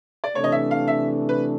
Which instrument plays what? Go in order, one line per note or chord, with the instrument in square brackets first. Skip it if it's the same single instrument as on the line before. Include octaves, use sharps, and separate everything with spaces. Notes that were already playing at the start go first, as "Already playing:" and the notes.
[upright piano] D5
[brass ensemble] C3 E3 A3 D4 [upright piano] C#5
[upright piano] D#5
E5
F5
E5
B4